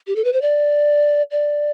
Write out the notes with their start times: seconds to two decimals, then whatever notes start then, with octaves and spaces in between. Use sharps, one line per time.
0.07 G4
0.16 A4
0.24 B4
0.33 C5
0.42 D5
1.31 D5